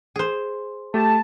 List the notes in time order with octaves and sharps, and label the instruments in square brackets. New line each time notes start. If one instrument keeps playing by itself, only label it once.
[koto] G#4 C5
[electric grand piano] A3 G4 [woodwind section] A5